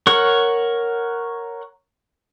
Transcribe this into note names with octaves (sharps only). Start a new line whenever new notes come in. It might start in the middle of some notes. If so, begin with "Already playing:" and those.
A#4 C#5 F#5 C#6